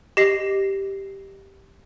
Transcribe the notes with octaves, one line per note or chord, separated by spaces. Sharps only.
G4 D#5 A#6 C7